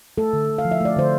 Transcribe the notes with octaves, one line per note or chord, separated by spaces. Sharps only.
A3 A4
D3
D3
F5
F3
E5
A3 D5
D3 C5